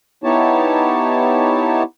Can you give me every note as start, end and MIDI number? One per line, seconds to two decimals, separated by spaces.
0.24 1.83 59
0.24 1.83 63
0.24 1.83 64
0.24 1.83 67
0.24 1.83 73
0.24 1.83 81